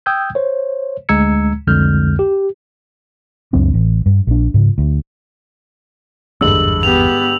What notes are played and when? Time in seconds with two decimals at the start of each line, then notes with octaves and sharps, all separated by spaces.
0.06 G5 D#6 E6 G6 G#6
0.35 C5 C#5
1.09 D2 G#3 A#5 E6 G#6 C#7
1.67 C2 F2 D3 G#3 F6 G6
2.19 G4
3.53 C#2 F#2 C4 D4
3.74 A1
4.06 G2
4.27 A#1 D4
4.54 G#2 C#3
4.78 D2
6.41 G#1 E2 G2 D3 G#3 E6 F#7
6.83 B3 G4 F7